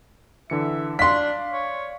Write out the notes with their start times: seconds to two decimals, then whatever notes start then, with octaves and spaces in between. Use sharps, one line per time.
0.50 D3 E3 E5 C#7
0.99 D4 D5 F5 C6 B6
1.52 C#5